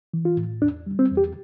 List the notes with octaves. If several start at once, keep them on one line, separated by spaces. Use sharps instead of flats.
E3
F4
A2
E2 D4
G3
C4
E2
G4